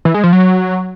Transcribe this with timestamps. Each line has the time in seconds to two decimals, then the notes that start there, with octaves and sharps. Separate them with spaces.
0.05 E3
0.14 G#3
0.24 F3
0.33 F#3